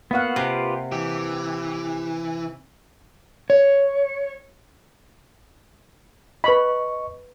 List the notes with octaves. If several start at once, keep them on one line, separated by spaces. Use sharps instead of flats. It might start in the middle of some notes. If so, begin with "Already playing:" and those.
A#3 B3 F#4 F5 F#5
C3 F4 G4 B4
E3 G4
C#5
B4 D#5 B5 C#6